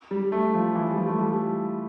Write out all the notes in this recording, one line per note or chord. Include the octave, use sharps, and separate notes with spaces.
G3
A3
F3
E3
G3
F3
A3
G3